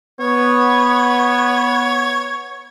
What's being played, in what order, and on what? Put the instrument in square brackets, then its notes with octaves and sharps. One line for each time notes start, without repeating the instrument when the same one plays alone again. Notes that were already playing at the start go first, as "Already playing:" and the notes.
[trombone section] B3 [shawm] C#5